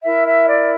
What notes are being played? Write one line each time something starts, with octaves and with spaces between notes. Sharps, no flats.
E4 A#4 E5
E5
D5